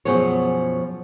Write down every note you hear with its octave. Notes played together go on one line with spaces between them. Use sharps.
F#2 B2 F3 G#4 C#5